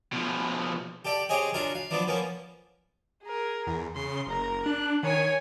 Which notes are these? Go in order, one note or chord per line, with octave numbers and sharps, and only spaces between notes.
B2 F3
G4 A4 D5 G5
C4 G4 G#4 C#5 D#5 G#5
C#4 D4 F4 F#4 A#4
F5
F3 F#3 B3 D4 D5
F3 A#3 B3 C#4
G#4 A#4
E2
C#3 C6
F#1 A#4 A#5
D4 F#6
D#3 C#5 G#5